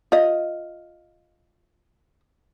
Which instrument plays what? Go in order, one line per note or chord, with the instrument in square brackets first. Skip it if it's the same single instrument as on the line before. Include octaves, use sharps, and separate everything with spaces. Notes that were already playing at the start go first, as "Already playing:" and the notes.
[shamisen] F4 D#5